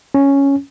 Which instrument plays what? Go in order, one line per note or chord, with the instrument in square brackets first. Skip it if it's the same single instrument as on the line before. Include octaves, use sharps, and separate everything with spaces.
[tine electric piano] C#4